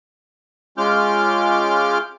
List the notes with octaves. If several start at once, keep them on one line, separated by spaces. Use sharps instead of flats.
G#3 C#4 F4 D6 F6 G6